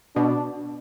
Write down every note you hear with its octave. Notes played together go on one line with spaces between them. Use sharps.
B2 D4